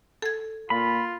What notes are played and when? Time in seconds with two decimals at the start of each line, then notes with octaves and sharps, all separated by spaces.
0.22 A4 G#6
0.70 A#2 F4 B5